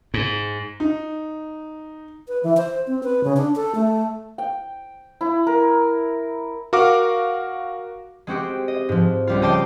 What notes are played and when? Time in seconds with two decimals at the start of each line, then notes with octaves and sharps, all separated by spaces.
0.14 G#2
0.80 D#4
2.28 B4
2.43 E3
2.57 C5
2.87 C4
3.03 B4
3.24 C#3
3.37 D4
3.56 A4
3.75 A3
4.38 G5
5.21 E4
5.47 A#4
6.73 F#4 A#4 F5 D6
8.27 G#3 C4 F#4 G4
8.68 D#5
8.89 G#2 F3
9.27 C#2 G3 F4
9.42 D#5 G5 A5 D6 G6 C7